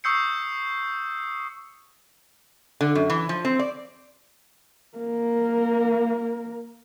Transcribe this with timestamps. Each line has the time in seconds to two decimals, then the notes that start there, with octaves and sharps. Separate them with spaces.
0.04 C#6 D#6 E6 G6 C7 C#7
2.81 D3
2.95 F#2
3.10 E3
3.29 F3
3.45 C4
3.59 D5
4.98 A#3 A#4